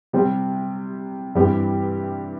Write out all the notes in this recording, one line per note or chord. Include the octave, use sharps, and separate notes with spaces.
C3 G3 C4 G4
G2 E3 G3 C4 G4